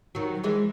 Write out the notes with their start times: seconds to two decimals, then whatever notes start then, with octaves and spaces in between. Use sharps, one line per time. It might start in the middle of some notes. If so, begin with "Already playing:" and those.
0.15 D#3 F#3
0.44 E3 G#3